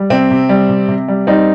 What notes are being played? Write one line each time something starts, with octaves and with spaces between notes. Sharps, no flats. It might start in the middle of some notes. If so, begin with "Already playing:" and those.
Already playing: G3
C3 C4
C3
G3
C3
C3
G3
G3 C4 D#4